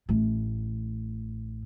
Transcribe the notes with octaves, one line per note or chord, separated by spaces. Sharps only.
A1 A2